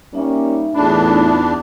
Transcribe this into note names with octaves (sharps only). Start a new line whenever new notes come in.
G3 A#3 C#4 D#4 E5
E2 A2 A3 D4 D#4 F4 B5